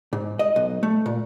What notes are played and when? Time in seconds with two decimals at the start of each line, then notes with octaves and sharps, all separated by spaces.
0.13 G#2
0.39 D#5
0.56 B1
0.83 A3
1.06 A#2